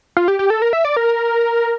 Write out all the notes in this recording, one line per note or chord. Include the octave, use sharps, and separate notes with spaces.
F4
G4
G4
A4
A#4
E5
D5
A#4